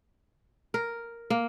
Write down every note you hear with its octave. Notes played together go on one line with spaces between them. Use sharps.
A#4
A#3